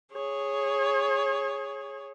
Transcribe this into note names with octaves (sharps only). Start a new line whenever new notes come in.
G#4 C#5